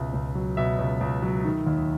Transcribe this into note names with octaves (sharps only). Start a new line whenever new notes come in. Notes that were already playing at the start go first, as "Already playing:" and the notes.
Already playing: C#2 B2 E5
C#2
F#3
B2 E5
C#2
C#2
F#3
D#3
D#2